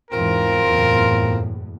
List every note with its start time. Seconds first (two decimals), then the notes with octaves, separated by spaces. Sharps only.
0.11 E2 G#2 E3 C4 F4 A#4
0.65 F#1 E2 A2